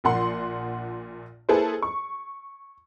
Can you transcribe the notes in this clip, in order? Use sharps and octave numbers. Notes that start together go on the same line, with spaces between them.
A#1 A#2 F#5 C6
A#3 E4 G#4 A4 B4 C5
C#6